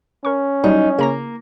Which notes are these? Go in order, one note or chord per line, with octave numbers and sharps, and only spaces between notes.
C#4 A#4 C#6
F#3 G3 D#4
C#3 A#3 A#5 A#6